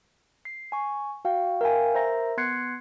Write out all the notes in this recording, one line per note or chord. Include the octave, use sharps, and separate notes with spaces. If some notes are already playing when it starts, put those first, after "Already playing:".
C7
G#5 C#6
F#4 F5 G5
A#4 E5 F5 G5 G#5
A#4 C5 E5 A#5 A#6
B3 C6 F#6 G#6 C7 C#7